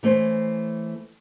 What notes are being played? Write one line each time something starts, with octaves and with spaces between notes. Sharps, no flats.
E3 A3 C#4 C5